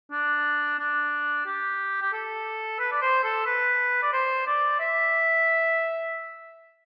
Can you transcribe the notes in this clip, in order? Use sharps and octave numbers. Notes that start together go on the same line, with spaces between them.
D4
D4
G4
G4
A4
B4
D5
C5
A4
B4
D5
C5
D5
E5